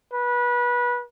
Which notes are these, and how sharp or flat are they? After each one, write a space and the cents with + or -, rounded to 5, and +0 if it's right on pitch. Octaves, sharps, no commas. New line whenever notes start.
B4 -25